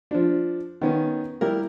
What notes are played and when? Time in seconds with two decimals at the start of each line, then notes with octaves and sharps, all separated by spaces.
0.11 F3 D4
0.82 D#3 B3 C#4
1.41 G3 E4 A#4